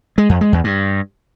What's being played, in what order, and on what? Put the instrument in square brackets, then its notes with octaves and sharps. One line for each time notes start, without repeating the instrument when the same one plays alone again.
[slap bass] G#3
F2
G#3
E2
G2